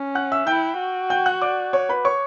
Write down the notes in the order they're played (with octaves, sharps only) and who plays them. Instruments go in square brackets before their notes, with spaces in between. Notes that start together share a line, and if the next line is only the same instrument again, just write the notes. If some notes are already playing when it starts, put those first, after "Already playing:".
Already playing: [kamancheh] C#4
[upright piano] F#5 F#6
E5 E6
[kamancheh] E4 [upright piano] G5 G6
[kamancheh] F#4
[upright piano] G5 G6
F#5 F#6
D5 D6
C#5 C#6
B4 B5
C#5 C#6